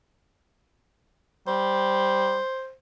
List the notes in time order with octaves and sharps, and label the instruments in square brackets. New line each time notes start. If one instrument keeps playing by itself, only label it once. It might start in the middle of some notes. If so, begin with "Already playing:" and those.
[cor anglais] G3 [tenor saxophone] C5